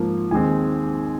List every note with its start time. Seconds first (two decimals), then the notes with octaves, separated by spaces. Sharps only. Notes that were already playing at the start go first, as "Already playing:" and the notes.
Already playing: G#2 F3 A#3
0.31 D#2 D#3 G#3 C4 G#5